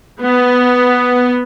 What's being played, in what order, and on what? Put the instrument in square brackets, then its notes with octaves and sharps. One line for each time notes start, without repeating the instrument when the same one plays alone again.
[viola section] B3